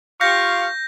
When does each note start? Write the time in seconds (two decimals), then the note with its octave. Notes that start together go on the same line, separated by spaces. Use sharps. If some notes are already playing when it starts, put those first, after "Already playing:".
0.21 F4 G4 F5 C#6 G6 A#6